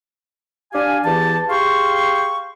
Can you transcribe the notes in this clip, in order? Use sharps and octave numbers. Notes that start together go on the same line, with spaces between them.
D4 G4 F5 G#5
E2 E3 G4 A5
G4 G#4 F5 G5 C6 C#6